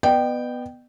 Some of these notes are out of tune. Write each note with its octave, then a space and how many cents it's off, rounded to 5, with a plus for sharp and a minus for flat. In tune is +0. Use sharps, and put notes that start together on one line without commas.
B3 +0 D#5 -45 G5 -10